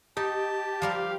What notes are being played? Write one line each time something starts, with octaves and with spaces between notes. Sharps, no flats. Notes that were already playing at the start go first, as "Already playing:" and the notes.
D#4 G4 A5
F3 G3 A#4 F5